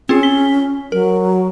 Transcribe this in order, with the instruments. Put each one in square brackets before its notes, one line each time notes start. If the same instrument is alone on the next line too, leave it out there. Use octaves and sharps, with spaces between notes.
[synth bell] C4 F4 G#4 [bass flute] C#4
[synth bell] B6 G7
[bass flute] F#3 [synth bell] A#4